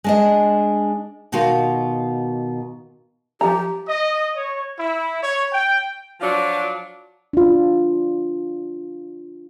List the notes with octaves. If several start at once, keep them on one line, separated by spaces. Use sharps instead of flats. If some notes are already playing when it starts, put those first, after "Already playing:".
G#3 D4 D#5
B2 D#3 F4 F#4 F5
F3 G4 A#5
D#5
C#5
E4
C#5
G5
F3 F#3 D4 F4
D4 F4